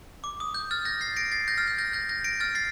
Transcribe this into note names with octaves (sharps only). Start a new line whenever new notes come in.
D6
D#6
G6
F6 A6
G6 A#6
A6 C7
A#6 D7
A6 C7
G6 A#6
F6 A6
G6
G6 A#6
G6 A#6
G6 A#6
A#6 D7
F6 A6
A6 C7